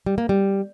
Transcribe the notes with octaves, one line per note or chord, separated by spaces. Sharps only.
G3
A#3
G3